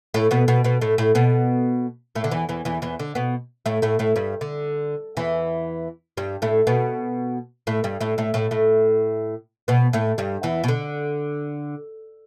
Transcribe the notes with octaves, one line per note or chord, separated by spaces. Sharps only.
A2 A3
B2 B3
B2 B3
B2 B3
A2 A3
A2 A3
B2 B3
A2 A3
D3
E2 E3
E2 E3
E2 E3
E2 E3
D3
B2 B3
A2 A3
A2 A3
A2 A3
G2 G3
D3
E2 E3
G2 G3
A2 A3
B2 B3
A2 A3
G2 G3
A2 A3
A2 A3
A2 A3
A2 A3
B2 B3
A2 A3
G2 G3
E2 E3
B2
D3